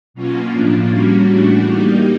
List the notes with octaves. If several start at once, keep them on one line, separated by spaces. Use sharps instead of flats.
B2 F#3 A#3 C#4 F4
A2 F3 A#3 D4
G3 A#3 C#4 F#4
A2 E3 A3 D4 F#4
G3 A#3 D#4 G4